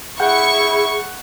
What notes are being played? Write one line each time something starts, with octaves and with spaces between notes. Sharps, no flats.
E4 G#4 F#5 C#6 G6